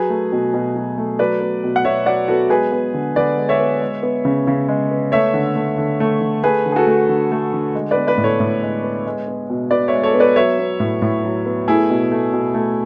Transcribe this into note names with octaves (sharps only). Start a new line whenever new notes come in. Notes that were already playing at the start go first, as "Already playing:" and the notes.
Already playing: F#3 G#4 B4
A3
B2
B2
F#3
A3
F#3 B4 D5
B3
B2
F#5
B2 C#5 E5
F#3 D5 F#5
B3 F#4 A4
G#3 G#4 B4
B3
D3
D3 B4 D5
G#3
C#5 E5
B3
G#3
B3
C#3
C#3
G#3
B3
A3 C#5 E5
D3
A3
D3
A3
D3
A3 G#4 B4
D3
G#4
F#4 A4
A3
D3
A3
D3
G#3
B4 D5
B3
B4 D5
A2
A4 C#5
A2
G#3
B3
G#3
B3
B2
B2 B4 D5
C#5 E5
G#3
A4 C#5
B3
B4 D5
F#3 C#5 E5
B3
A2
A2
F#3
B3
A3 E4 G#4
B2
A3
B2
A3